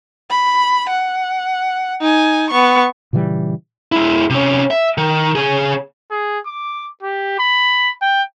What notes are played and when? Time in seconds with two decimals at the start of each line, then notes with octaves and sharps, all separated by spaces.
0.30 B5
0.90 F#5
2.01 D#4 G#5
2.51 B3 C#6
3.13 A#2 C#3 E3 G3
3.92 G#3 E4
4.30 C3 C#4
4.71 E5
4.98 D#3
5.35 C#3 G#4
6.11 G#4
6.46 D6
7.03 G4
7.39 B5
8.02 G5